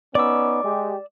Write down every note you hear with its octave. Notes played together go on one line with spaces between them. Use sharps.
B3 C#4 D#4 D5 D6 E6
G#3 G4